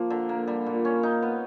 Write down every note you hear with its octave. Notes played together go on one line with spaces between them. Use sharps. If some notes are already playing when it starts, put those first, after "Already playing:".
Already playing: F3 A#3
D3
A#3
G3
A#2
C#4
D#4
B3